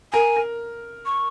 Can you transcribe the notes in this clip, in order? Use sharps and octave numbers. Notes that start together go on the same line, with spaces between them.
A#4 G#5
A#4
C#6